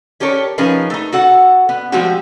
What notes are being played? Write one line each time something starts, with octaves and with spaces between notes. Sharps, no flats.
C#4 G4 A4 A#4 C#5
F3 C#4 D#4 G#4 A#4 B4
A3 D#4
F#4 A4 F#5
B3
F3 G#3 A3 C4 F#4 G4